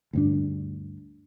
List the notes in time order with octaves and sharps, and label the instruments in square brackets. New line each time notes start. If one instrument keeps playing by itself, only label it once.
[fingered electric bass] D2 G2 D4